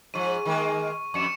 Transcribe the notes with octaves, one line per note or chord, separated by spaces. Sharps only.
G#2 F3 C#6 D#7
D#3 G#3 A#3
F2 C#6 C#7 E7